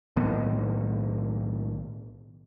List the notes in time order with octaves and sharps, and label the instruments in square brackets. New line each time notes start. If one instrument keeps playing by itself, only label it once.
[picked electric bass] B1 A2 D#3 B3